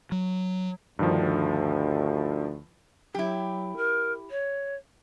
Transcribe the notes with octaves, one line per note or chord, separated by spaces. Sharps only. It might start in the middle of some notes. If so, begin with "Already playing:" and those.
F#3
D2 G2 D#3 F3
F#3 E4 G4
A#4
C#5